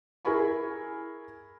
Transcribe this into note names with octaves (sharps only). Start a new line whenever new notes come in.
E4 G#4 A#4 G#5 B5 C#6